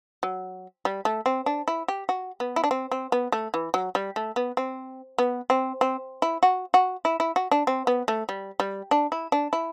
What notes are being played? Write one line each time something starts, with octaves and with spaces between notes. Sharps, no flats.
F#3
G3
A3
C4
D4
E4
G4
F#4
B3
E4
D4
C4
C4
B3
A3
E3
F#3
G3
A3
B3
C4
B3
C4
C4
E4
F#4
F#4
E4
E4
F#4
D4
C4
B3
A3
G3
G3
D4
E4
D4
E4